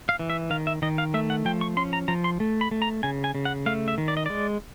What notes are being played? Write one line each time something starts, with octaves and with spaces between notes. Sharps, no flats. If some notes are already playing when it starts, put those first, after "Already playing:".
F5
E3
E5
D#3 F5
E5
D#3 D#5
F5
A3 E5
F#5
F3 G5
C#6
C#4 C6
A#5
F3 A#5
C6
A3
B5
A3
A#5
C#3 G#5
G#5
C#3
F#5
A3 F5
E5
D#3
D5
D#5
G#3 D5